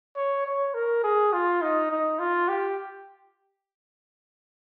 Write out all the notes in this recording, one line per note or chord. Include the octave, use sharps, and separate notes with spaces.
C#5
C#5
A#4
G#4
F4
D#4
D#4
F4
G4